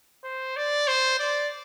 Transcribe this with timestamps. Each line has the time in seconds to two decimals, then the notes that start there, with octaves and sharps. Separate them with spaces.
0.24 C5
0.56 D5
0.88 C5
1.20 D5